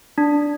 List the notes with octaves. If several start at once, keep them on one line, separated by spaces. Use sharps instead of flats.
D4